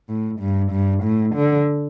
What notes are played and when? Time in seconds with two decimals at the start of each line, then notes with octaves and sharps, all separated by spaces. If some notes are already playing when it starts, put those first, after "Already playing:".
0.09 A2
0.40 G2
0.71 G2
1.03 A2
1.35 D3